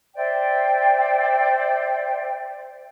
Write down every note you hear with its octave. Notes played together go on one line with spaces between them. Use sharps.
C5 D5 E5 G5